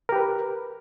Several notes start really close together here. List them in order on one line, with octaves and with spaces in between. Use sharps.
A#4 G4 B4